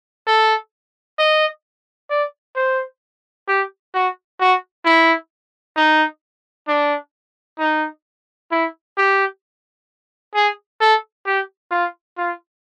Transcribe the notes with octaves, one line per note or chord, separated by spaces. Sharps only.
A4
D#5
D5
C5
G4
F#4
F#4
E4
D#4
D4
D#4
E4
G4
G#4
A4
G4
F4
F4